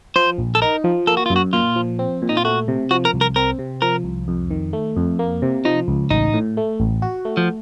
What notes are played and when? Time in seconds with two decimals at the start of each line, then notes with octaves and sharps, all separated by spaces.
0.16 F3 C5
0.38 A#1
0.55 A4
0.62 D#4 A#4
0.84 F3
1.07 A#3 A4
1.17 F#4
1.26 F4
1.30 F#2
1.36 F#4
1.53 A#2 F4
1.76 F3
1.99 C4
2.22 A#2
2.29 D#4
2.37 F4
2.45 A3 F#4
2.68 C3
2.91 F3 F#4
3.05 A#4
3.14 C2
3.21 A#4
3.36 C4 A#4
3.59 C3
3.82 F3 A#4
4.04 C2
4.28 F2
4.51 D#3
4.73 A3
4.97 F2
5.19 A#3
5.42 C3
5.65 F3 D#4
5.88 C#2
6.11 A1 D#4
6.34 A2
6.57 A3
6.80 A1
7.02 F#4
7.25 A3
7.37 F3